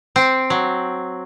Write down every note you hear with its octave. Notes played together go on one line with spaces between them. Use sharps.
C4
F#3